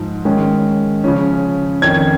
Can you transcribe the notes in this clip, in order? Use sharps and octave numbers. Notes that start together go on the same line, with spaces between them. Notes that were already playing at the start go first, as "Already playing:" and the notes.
Already playing: G#2 F3 G#3
D#3 G#3 C#4
C#3 F3 C#4
F2 D#3 C#4 G#6